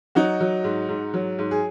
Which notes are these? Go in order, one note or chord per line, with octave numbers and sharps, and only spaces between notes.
F#3 D#4 F#4
F#3
G#2
G#2
F#3
G#2
G#4